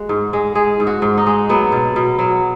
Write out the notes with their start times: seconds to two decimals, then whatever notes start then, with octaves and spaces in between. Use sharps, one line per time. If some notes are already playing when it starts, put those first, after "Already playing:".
Already playing: G#3 F#4
0.09 G#2
0.33 G#3
0.55 G#3 G#4
0.80 G#2
0.87 F#4
1.02 G#2
1.18 D#4
1.26 G#3
1.49 F#3 B3
1.72 B2
1.96 B2
2.19 F#3